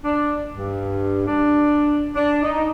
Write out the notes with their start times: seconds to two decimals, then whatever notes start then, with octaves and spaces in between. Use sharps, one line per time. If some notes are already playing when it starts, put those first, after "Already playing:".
0.03 D4
0.55 G2
1.27 D4
2.15 D4
2.42 D#4